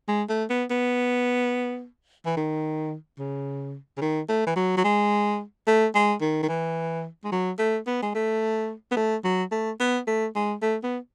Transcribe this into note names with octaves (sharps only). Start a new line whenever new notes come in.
G#3
A3
B3
B3
E3
D#3
C#3
C#3
D#3
A3
E3
F#3
F#3
G#3
A3
G#3
D#3
D#3
E3
G#3
F#3
A3
B3
G#3
A3
B3
A3
F#3
A3
B3
A3
G#3
A3
B3